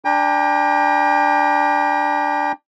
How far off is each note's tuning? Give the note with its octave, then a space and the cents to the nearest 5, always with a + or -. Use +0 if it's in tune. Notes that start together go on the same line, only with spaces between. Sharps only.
D4 +0 G5 +35 A#5 +45